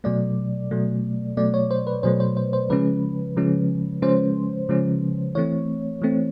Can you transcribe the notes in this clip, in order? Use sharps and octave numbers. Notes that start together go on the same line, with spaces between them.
B2 F#3 A3 D5
B2 F#3 A3
B2 F#3 A3 D5
C#5
C5
B4
B2 F#3 A3 C5
C5
C5
C5
C#3 F3 G#3 C#4 B4
C#3 F3 G#3 C#4
C#3 F3 G#3 C#4 C5
C#3 F3 G#3 C#4
E3 A3 C4 C#5
E3 A3 C4